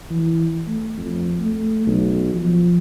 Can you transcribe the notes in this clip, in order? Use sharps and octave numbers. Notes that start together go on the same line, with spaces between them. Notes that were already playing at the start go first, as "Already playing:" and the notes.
E3
A3
F2
A3
B1
F3